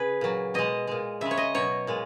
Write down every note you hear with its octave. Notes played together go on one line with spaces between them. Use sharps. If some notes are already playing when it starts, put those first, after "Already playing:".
Already playing: C#3 G#4 B4
A#2 F#3
B2 G#3 D#5
A#2 G#3
C#3 G#3 E5
C#5
D#5
B2 F#3 C#5
A#2 G#3